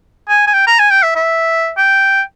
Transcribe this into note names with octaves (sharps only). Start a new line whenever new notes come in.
G#5
G#5
G5
A#5
G#5
G5
E5
E5
G5